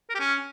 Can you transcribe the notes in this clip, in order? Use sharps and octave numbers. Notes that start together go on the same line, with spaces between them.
A#4
G4
C#4